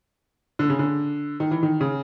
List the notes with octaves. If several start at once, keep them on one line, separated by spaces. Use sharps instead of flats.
D3
C#3
D3
D#3
E3
D#3
C#3